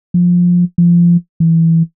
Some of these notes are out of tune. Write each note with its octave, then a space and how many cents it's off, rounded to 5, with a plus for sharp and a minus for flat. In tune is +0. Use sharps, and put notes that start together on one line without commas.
F3 +15
F3 -20
E3 -5